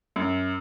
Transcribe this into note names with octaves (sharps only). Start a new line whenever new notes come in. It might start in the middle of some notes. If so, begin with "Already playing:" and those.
F#2